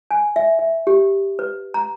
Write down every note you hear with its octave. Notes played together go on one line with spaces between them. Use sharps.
G#5
E5
E5
G4
B4
A#5